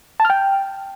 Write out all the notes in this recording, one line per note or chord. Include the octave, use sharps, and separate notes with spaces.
A5
F6
G5